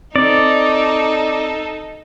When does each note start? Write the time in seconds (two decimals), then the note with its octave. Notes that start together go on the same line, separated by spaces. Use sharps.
0.16 C4 D#4 A4 D5